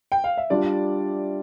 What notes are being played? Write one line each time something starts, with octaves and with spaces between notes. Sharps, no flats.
G5
F5
E5
G3 D4 F4 D5